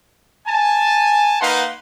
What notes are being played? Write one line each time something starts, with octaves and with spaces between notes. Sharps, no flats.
G#5 A5
A#3 D#4 B4 F5 F#5 C6